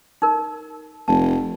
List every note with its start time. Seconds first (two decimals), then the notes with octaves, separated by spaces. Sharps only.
0.22 D#4 A#4
1.08 F1 A5